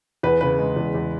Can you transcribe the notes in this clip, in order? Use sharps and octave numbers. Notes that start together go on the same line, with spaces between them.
E2 B4
C#3 B4
G#3
E2
E2